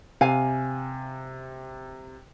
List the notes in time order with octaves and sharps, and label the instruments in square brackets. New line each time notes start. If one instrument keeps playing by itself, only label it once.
[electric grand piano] C3 [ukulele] F5 G#5